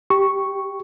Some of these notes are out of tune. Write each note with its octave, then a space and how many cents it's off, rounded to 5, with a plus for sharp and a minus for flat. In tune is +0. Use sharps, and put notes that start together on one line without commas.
G4 +0 C#6 +0